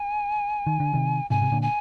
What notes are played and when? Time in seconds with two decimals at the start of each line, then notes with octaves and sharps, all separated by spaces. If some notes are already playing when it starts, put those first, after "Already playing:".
Already playing: G#5
0.67 D#3
0.80 D3
0.94 C3 D#3
1.30 G#2 C3 G#5
1.42 C3
1.52 A#2 D3
1.62 G#5